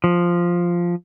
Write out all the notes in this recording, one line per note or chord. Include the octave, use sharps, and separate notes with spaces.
F3